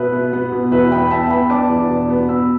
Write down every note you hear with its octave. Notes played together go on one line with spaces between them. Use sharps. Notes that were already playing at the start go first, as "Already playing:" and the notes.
Already playing: B2 B4 E5
B3
B3
B2
E2 B4 E5
B3 G5 B5
B3 E5 A5
B3 G5 B5
D4 A5 D6
E2
B2
B3
B3 B5 E6